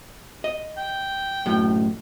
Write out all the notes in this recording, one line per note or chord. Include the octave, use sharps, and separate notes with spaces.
D#5
G5
F#2 A2